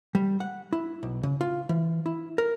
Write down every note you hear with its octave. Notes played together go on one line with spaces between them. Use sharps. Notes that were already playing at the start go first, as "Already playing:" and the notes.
G3
F#5
E4
B1
C#3
F4
E3
E4
A#4